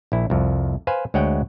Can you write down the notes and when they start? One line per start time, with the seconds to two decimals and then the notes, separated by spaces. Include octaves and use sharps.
0.12 A#1 E4
0.30 C2 F2
0.87 B4 C5 F5 G#5
1.14 D2 G#3 C#5 F#5 G5